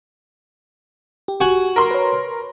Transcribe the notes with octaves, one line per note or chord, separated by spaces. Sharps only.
G4
F#4 F#5 G#5
A#4 C6
B4 C#5